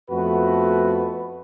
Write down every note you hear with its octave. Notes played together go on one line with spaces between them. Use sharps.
F2 A3 B3 F#4 B4